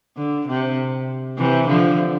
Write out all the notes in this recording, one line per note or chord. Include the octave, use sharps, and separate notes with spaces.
D3
C3
C3 E3
D3 F3